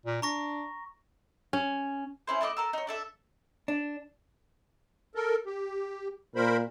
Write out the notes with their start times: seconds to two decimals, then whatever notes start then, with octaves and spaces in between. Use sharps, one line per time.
0.06 A#2
0.22 D4 A#5 C#6 A#6
1.53 C#4
2.27 C#4 E4 C5
2.41 A3 E4 D#5 D6
2.57 A4 A#4 E6
2.73 D#4 C#5
2.87 D4 A4 E5
3.68 D4
5.15 A4 A#4
5.45 G4
6.36 A#2 A#4 C5 B5